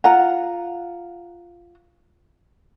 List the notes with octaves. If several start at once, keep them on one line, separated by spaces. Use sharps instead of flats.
F4 F#5 A#5